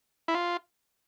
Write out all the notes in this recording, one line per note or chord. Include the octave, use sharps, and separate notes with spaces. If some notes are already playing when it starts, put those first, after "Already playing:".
E4
F4